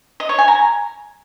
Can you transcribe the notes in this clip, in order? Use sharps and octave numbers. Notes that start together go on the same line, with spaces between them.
D#5
C#5
G#5
A#5